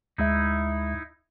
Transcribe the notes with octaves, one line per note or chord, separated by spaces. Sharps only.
D2 G#3 D#4 E4 E5